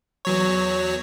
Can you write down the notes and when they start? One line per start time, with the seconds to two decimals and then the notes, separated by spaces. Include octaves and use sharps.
0.25 E2 F#3 C#5